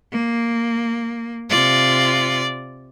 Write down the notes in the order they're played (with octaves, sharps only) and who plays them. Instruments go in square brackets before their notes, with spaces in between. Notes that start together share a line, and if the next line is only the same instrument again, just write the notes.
[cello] A#3
[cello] C3 F4 [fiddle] D5